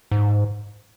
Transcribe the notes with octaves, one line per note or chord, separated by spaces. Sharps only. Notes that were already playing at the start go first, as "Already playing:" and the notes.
G#2